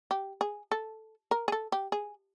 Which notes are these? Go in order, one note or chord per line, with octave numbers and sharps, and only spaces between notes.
G4
G#4
A4
A#4
G#4
A4
G4
G#4